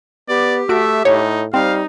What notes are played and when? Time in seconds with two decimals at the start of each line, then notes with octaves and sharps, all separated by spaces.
0.29 B3 G4 D5
0.69 A3 F#4 E5 D7
1.05 A2 D#4 C#5
1.54 G3 C4 D#4 F5